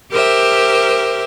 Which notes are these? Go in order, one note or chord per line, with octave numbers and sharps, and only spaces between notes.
G4 A#4 C5 E5